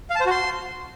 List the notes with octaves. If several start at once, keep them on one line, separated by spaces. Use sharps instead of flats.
F5
A5
C5
F#4
C6